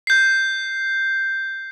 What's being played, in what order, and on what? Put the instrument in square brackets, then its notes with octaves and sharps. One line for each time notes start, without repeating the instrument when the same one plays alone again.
[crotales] G6 C7